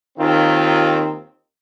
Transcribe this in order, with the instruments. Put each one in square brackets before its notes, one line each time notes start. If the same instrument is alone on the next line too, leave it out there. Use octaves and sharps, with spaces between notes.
[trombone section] D#2 D#3 C4 F4